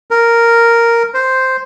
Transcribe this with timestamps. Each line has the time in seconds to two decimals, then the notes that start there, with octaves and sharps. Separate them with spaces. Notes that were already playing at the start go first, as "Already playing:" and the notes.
0.11 A#4
1.14 C5